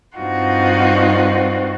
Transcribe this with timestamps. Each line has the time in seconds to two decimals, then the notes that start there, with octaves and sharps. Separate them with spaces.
0.17 G2 C4 D#4 F4 F#4